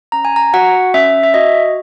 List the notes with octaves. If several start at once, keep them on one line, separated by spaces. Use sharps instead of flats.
C#4 A#5
G#5
A#5
F#4 F#5
C#4 E5
E5
F#4 D#5